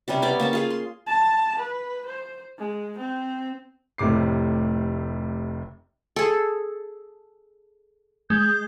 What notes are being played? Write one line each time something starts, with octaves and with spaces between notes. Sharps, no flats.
C3 G3 C#4 G4
B3 C#5 D5 G5
A#3 C#4 A5
F4 G#4 F5
C6
A5
B4
C5
G#3
C4
F1 A2 C3 D6 C7
G#4 A4
G#3 G6